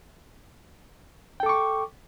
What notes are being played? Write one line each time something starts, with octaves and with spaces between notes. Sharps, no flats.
A4 G5 C#6 D6